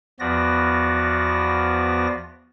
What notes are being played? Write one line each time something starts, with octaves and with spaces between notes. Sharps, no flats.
E2 F3 B3 F#4 D5 A#6